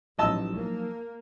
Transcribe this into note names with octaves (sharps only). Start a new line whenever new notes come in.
A1 F3 F#3 D#4 D#5 A5 E6
A#3